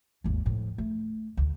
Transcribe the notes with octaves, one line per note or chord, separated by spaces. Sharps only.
G#1 D#2
A2 F3
A3
D2